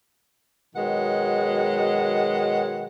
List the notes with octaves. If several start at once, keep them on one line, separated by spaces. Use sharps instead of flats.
B2 D#3 F#3 G#3 F#5